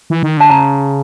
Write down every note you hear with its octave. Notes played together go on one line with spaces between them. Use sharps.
E3
D#3
D3 A5
C#3 A#5